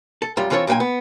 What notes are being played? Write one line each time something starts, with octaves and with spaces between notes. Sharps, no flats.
A4
F#2 G3 F4
E3 C4 F4 A4 B4 C#5
B1 A#2 C5 G5 G#5
B3